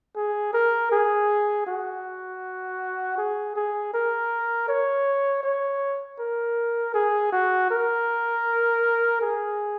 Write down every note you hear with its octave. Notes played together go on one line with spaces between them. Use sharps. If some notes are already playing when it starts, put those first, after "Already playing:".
G#4
A#4
G#4
F#4
G#4
G#4
A#4
C#5
C#5
A#4
G#4
F#4
A#4
G#4